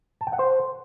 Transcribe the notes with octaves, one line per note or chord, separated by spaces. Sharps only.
A5
G5
F#5
C5